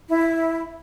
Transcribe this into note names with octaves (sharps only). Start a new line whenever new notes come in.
E4